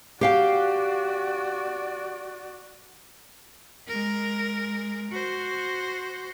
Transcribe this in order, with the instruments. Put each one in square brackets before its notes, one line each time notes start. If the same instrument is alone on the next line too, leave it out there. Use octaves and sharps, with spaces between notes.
[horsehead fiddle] F#4 D5 [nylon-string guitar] G4 F5 G5
[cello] G#3 A#4
F#4 C5